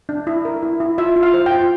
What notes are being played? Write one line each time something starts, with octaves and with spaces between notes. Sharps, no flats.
D4
E4
A#4
E4
E4
F4 E5
F4
F5
C5
G5
F4